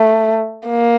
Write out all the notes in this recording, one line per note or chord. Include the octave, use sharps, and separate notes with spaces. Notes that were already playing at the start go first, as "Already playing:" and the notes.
Already playing: A3
A#3